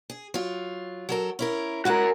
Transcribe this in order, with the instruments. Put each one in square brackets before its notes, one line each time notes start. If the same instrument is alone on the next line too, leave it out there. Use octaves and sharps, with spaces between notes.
[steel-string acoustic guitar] G#4
F#3 F4
F#3 A4 A#4
C#4 E4 A#4
[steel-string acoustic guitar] G#3 E4 F#5 [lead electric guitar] F#4 A#4